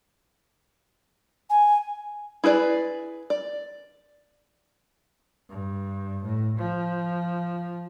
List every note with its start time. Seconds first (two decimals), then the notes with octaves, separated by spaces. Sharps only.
1.49 G#5
2.44 E4 G#4 B4 D5
3.30 D5
5.49 G2
6.23 A2
6.58 F3